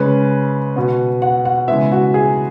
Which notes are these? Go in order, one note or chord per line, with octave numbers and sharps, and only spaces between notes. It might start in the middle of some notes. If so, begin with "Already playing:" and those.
Already playing: C#3 G#3 C#4 B4
B2 B3
F#5
F#5
C#3 E3 G#3 B3 E5
F#4
G#4